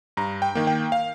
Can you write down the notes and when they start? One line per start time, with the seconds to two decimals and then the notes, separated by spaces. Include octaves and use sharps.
0.17 G2 A#5
0.42 G5
0.55 D#3 A#3
0.67 G5
0.92 F5